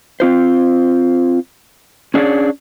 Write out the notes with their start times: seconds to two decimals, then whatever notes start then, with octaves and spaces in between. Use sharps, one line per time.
0.20 C4 F4 C5
2.14 C#4 D4 G#4 C#5 D5